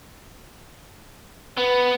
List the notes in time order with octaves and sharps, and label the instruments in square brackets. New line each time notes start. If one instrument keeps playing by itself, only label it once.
[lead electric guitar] B3 [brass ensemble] B4